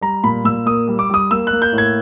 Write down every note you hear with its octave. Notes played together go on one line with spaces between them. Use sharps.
G3 A#5
A#2 B5
A#2 E6
A#3 D#6
G3
D6
G3 D#6
A#3 E6
F#6
A#3
G6
A2
G#6